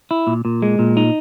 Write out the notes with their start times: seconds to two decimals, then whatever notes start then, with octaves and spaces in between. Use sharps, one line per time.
0.11 E4
0.27 A#2
0.45 A#2
0.62 G#3
0.79 A#2
0.97 D#4